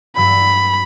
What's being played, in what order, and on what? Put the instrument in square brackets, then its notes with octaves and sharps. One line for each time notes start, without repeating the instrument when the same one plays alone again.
[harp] G2 F#3 E6 [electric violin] B5